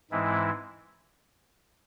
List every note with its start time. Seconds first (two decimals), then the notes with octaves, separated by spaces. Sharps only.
0.11 G#2 E3 G#3 C4 E4